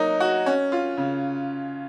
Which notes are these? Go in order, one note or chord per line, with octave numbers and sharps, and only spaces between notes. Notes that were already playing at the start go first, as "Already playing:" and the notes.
Already playing: F#3 A#3 D#4
F#4
C#4
F4
C#3